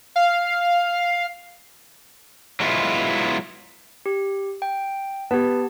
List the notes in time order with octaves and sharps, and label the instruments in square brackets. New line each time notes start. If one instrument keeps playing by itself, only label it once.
[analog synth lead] F5
[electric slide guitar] F#3 G#3 B3 E4 F4
[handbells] G4
G5
[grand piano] B3 [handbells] G4 A5